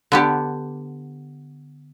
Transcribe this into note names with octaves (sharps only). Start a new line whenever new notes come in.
D3 B3 G4